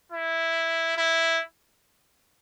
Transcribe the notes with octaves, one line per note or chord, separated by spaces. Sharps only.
E4
E4